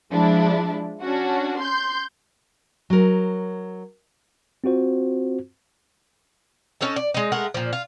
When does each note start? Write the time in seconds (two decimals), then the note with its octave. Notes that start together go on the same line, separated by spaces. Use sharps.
0.13 F3 G#3 D4 E4
1.02 C#4 D4 F#4
1.61 C6 G6
2.90 F#3 A#4
4.64 C4 F4 F#4 C5
6.81 C#4 D#4 A4 A5
6.96 D5
7.14 G#3 D#4
7.32 G#3 A3 A#4 F#5
7.54 A#2 F3
7.73 F4